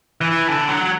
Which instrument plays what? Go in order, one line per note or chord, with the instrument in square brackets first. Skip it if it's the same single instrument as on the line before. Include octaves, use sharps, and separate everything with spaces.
[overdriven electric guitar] E3
D3
F#3